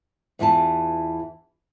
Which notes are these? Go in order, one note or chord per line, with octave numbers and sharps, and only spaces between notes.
E2 E3 F4 G5 A5